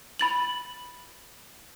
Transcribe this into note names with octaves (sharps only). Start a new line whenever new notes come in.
B5 A6 F#7